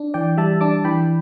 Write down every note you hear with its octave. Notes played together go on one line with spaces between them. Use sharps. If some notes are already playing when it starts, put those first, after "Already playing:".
Already playing: D4
E3 D5 G5
G3 E5 A5
D4 A5 D6
E3 G5 B5